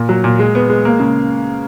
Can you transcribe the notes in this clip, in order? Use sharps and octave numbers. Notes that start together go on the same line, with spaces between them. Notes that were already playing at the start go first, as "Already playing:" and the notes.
Already playing: A#2
F#3
A#2
G#3
B3
G#3
A#3
C#3